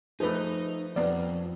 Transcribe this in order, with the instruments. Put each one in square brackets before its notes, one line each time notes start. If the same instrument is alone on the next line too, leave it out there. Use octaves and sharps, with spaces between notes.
[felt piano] F3 A3 [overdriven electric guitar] D#4 [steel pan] G#4 B4
[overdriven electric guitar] F2 [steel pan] B3 D5